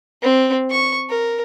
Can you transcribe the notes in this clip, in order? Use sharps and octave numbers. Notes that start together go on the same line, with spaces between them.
C4
C#6
A#4